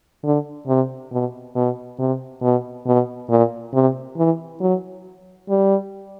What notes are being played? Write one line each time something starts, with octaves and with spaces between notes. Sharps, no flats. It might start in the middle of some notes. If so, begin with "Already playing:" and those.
D3
C3
B2
B2
C3
B2
B2
A#2
C3
E3
F#3
G3